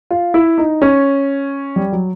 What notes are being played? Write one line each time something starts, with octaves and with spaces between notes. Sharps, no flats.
F4
E4
D#4
C#4
G3
F#3